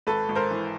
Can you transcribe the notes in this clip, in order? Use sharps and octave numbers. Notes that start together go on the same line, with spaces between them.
G#1 A4 B4
G#1
A#4 C5
E3